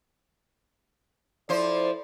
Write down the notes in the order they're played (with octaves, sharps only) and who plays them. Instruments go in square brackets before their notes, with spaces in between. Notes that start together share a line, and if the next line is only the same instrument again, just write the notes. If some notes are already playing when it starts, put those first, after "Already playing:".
[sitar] F3 C5 [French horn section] E4 A4 D5